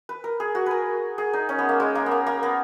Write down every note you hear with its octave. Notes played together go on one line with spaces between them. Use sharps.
B4
A#4
G#4
F#4
A#4 B4
G#4
D#4
C#4
B3
A#3
G#3
A#3
B3
A#3
A#3
B3